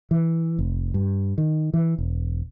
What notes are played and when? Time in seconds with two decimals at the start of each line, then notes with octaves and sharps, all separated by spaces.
0.11 E3
0.59 F1
0.94 G2
1.38 D#3
1.74 E3
1.98 E1